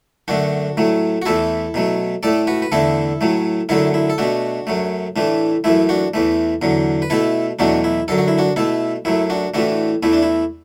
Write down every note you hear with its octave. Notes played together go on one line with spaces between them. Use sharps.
F#2 D3 A3 D4 F#4
A2 F#3 A3
F#4
E2 E3 A3 E4 A4
B2 F#3 A3
A2 A3 A4 D5
F#4 B4
B4
E2 D3 A3 E4 A4
A2 F#3 A3
F#2 D3 F#3 A3 E4 A4
E4
A4
B2 A3 D4 F#4
F#2 F#3 A3
A2 E3 A3 D4
F#2 E3 A3 E4
D4 F#4
E2 E3 A3
E2 D3 F#3
B4
B2 A3 E4 A4
E2 B2 F#3 A3 D4 F#4
E4
F#2 D3 F#3 A4
F#4
E4
D4 F#4
B2 A3 E4 A4
F#2 F#3 A3 E4
D4 F#4
A2 E3 A3 D4 F#4
E2 E3 A3 E4
D4
E4